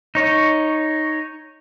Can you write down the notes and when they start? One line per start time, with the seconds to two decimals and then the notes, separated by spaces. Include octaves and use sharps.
0.15 D#4 C#5